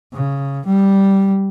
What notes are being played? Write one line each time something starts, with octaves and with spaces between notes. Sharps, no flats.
C#3
G3